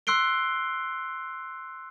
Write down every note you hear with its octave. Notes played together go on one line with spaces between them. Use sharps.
C6 E6 F#6 C7 D7 G7